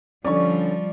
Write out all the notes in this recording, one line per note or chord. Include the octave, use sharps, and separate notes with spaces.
D3 F3 G3 C#4 D5 C#6